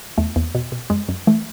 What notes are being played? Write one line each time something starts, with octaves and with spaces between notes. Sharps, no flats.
E2 A3
E2
B2
B2
F#2 G#3
F#2
E3 A3